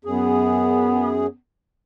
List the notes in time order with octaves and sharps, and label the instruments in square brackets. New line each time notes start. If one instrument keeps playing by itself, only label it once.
[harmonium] F#2 G#4 [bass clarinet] B3